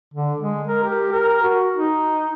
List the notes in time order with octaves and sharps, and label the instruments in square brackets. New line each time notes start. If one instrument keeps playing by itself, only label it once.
[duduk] D3
G#3
A#4
G4
A#4
F#4
D#4